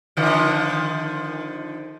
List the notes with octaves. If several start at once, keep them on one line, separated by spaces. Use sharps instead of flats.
D3 D#3 F3